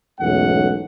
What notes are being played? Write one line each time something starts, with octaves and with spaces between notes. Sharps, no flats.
B1 E2 G#2 A3 C#4 F#5